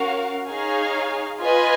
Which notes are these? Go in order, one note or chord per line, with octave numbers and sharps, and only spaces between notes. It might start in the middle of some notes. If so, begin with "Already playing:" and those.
Already playing: C#4 F#4 A#4 F5
D#4 G#4 C#5 F5 G#5
F4 B4 D#5 G#5